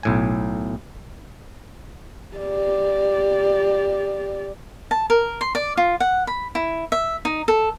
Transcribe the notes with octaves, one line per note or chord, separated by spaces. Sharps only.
B1 A2 G#5
G4 D5
A5
A#4
C6
D5
F4
F#5
B5
E4
E5
D#4
A4